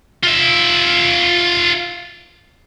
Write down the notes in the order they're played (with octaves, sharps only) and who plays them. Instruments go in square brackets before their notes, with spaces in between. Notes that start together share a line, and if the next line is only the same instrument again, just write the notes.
[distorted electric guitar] F4 E5